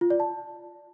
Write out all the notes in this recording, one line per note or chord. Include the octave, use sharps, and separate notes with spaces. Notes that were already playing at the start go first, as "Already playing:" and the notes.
F4
D5
A5